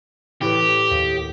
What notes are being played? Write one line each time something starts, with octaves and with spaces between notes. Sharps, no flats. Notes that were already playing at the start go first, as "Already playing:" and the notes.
A2 E3 G4 D5
D#2 D#5